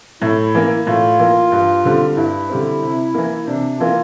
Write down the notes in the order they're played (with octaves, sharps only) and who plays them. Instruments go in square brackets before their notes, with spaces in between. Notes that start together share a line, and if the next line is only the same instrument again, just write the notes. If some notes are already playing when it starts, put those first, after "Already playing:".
[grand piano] A2 [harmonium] E4
[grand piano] E3 A#3
[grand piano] A2 [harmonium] F4
[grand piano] E3 A#3
G2
D3 G3 C4
[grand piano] G2 [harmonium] E4
[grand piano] D3 G3 C4
C3
E3 A#3
[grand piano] C3 [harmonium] D4
[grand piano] E3 A#3 [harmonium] F4